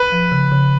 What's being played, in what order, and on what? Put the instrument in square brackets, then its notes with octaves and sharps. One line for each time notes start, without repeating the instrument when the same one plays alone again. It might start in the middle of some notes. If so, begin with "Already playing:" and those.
Already playing: [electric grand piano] B4
[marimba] F3
C#3
C#3